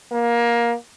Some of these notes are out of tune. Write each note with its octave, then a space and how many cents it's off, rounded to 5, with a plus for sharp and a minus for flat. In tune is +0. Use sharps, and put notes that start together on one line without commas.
A#3 +20